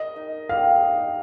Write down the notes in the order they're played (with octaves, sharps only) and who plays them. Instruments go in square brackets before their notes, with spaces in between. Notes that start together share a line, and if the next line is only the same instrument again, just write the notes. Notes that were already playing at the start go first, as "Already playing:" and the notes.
Already playing: [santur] A#4 [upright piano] D#5
[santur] D#4
[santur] G4 [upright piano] F5
[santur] D#4